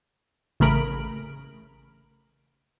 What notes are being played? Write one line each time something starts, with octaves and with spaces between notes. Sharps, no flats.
A1 C#3 A3 A#4 B5 D7